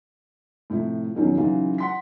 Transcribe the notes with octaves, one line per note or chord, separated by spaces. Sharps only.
A2 C3 F3 E4
E2 B2 D#3 F3 F#3 C#4
C#3 E3 F#3 D#4 F4
F#5 C6 B6